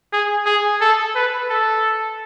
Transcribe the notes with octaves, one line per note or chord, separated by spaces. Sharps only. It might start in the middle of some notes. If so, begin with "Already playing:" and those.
G#4
G#4
A4
B4
A4